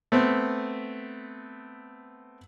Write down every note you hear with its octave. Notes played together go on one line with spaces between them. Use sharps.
A3 B3 C4